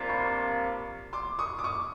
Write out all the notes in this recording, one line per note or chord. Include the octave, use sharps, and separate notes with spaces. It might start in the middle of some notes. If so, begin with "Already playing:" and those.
Already playing: C3 F3 A#3 D4 F4
B5 C#6
C6 D6
C#6 D#6
D6
C#6 D#6